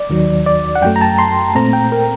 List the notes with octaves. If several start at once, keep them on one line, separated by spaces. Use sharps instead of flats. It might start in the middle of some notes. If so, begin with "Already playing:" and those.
Already playing: D5
D#2 D#3 F#3
D5
F#5
F#2 F#3 A3 G5
A#5
A5
C6
A#2 A3 C4 A#5
G5
A#4